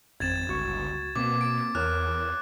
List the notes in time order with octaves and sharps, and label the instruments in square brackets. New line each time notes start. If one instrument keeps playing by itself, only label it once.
[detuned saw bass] G#1 [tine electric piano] F2 C4 [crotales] G#6 A6 E7
[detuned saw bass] G1 [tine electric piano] C#2 F#4 C#6
[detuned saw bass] B2 [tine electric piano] A#3 C4 [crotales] D6
[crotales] D7
[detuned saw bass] E2 [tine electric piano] A#4 C#5 F6 [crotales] F#6